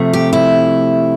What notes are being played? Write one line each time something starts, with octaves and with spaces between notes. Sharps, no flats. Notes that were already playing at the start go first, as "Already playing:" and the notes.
Already playing: C3 F3 A3
G4
E4